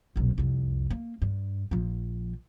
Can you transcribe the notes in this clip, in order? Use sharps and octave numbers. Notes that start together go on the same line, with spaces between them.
D#1 B1
C2 F2
A#3
G2
A#1 F3